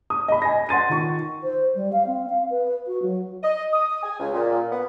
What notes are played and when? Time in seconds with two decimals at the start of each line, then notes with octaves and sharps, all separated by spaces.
0.10 D#6
0.28 D#5 B5
0.42 G#5 A#6
0.69 F#5 C6 A6 D#7
0.89 D#3 F4 C#6
1.44 C5
1.75 G3
1.93 F5
2.07 C4
2.30 F5
2.50 B4
2.87 F#4
3.02 F#3
3.43 D#5
3.73 D#6
4.03 G#5
4.19 C#2
4.34 A#2
4.71 B3